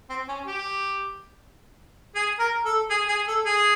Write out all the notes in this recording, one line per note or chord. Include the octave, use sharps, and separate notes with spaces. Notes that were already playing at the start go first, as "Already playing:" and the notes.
C4
C#4
G4
G#4
A#4
A4
G#4
G#4
A4
G#4